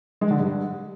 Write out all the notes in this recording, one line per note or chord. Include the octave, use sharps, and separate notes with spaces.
G#3
D3
G2